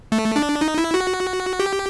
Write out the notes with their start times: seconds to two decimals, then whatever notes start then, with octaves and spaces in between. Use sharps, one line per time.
0.12 A3
0.36 D4
0.61 D#4
0.78 E4
0.94 F#4
1.60 G4